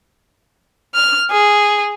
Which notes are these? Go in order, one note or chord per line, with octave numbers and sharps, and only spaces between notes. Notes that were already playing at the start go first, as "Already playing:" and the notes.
F6
G#4